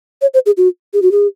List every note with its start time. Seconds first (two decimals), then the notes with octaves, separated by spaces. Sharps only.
0.22 C#5
0.34 C5
0.46 G#4
0.57 F#4
0.93 G#4
1.02 F#4
1.12 G#4